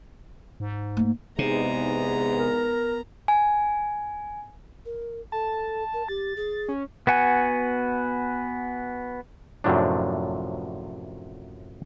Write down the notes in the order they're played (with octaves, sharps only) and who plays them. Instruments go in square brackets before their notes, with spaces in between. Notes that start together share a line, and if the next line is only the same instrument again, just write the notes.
[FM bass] G#2
[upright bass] A3 A#3
[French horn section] E2 G#2 G#3 [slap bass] C3 [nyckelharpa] B3 A#5 [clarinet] D#4
[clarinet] A#4
[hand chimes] G#5
[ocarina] A#4
[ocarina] A4 [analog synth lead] A5
[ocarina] A#4
[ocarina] G4 [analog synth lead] A6
[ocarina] G#4
[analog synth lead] C#4
[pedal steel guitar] B3 F#4 F#5 G#5
[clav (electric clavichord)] F#2 A2 C3 F3 F#3 D4